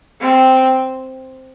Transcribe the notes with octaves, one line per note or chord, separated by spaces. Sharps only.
C4